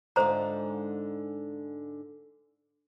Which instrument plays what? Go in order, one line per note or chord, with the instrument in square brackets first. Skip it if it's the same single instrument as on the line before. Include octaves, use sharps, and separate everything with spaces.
[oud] G#2 D3 F4 [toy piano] C5 A#5